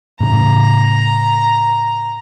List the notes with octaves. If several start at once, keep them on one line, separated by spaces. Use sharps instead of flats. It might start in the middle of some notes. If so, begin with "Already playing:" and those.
A2 C#3 A#5